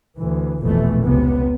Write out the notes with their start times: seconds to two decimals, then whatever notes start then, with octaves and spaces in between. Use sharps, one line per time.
0.16 D2 E3
0.61 F1 A#1 B2 E3 A3
1.05 C#2 C3 B3